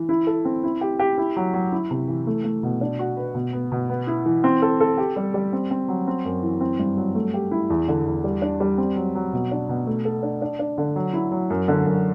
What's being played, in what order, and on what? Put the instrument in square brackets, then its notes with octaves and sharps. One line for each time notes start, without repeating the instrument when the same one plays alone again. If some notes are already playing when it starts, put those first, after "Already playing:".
Already playing: [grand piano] E3
E4
A4
C4
E4
G4
G4
E4
F#3
F#3
E4
C3
E3
A3
A3
B2
D4
F#4
B4
B2
B3
B2
B3
E4
E3
C4
A4
A4
G4
G3
G3
C4
C4
F#3
C4
F#2
E3
C4
G2
F#3
A3
G4
E4
E2
D3
E2
G3
D4
G3
C4
F#3
F#3
B2
D4
B2
A3
A4
D4
D4
D4
D3
F#3
E4
F#3
F#2
D3
F#2